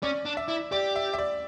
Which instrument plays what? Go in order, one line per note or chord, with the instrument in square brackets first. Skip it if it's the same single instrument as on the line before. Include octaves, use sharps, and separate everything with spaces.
[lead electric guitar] C#4 [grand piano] D5
[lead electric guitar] D4
[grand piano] E5
[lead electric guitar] E4
[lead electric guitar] G4 [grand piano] D5
[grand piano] E5
E5
D5